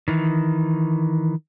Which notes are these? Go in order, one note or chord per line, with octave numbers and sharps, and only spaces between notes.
D#3 E3